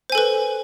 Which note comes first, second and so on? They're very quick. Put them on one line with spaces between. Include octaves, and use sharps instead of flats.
C5 G#5 A4 B4